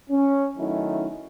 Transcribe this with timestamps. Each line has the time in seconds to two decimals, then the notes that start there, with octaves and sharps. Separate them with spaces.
0.10 C#4
0.58 D#3 F#3 A3 C#4 D#4 E4